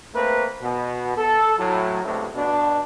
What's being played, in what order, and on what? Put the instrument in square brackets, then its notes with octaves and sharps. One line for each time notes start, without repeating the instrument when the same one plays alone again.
[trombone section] A3 A#3 C4 B4
B2
A4
A2 F#3
C#2 G2 C3 A3
B2 D4